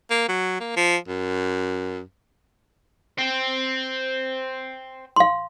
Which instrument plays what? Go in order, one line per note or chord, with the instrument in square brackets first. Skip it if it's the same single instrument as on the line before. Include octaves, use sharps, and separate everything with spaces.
[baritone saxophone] A#3
F#3
A#3
F3
F#2
[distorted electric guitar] C5 G5
[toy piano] F5 C6